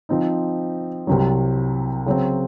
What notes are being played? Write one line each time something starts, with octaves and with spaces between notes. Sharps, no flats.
F3 C4 D#4
C2 C3 F#3
C#3 F#3 C4